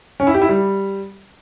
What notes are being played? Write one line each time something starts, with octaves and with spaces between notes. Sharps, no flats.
C#4
E4
G4
E4
G3